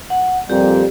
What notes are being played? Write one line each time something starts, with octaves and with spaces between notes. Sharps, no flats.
F#5
F2 A#2 G3 G4